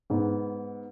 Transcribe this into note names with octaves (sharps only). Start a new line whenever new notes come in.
G#2 B3